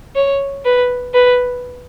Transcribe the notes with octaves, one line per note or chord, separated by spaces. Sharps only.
C#5
B4
B4